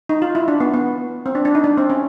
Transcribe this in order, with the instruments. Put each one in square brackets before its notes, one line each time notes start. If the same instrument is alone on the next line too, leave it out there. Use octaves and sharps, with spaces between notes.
[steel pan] D#4
F4
E4
D4
B3
B3
C4
D4
D4
D#4
D4
C4
C#4